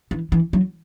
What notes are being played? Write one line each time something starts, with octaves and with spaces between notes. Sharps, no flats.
E3
E3
F#3